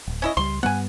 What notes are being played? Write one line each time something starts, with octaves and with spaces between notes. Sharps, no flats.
D1
C#4 E4 D#5
C#2 G3 C6
G2 G3 B3 F#5 G#5